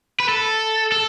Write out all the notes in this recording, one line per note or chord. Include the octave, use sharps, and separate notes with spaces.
B4
A4
A4